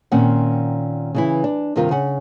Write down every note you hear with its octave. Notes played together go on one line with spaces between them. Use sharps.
A#2 D#3 C4 C#4 F#5
C#3 E3 E4
D4
G2 C3 D#3 F4 A#4
C#3 F#5